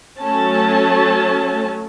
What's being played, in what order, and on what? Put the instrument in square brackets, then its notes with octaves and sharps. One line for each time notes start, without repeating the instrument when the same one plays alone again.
[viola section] F#3 A3 C#4 A5